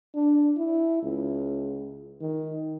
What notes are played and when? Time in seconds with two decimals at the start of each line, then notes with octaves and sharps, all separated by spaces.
0.15 D4
0.57 E4
1.02 C#2
2.21 D#3